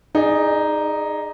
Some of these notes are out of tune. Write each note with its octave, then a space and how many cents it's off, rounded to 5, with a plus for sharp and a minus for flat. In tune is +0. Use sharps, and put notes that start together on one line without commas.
D#4 +0 G#4 +0 D5 +30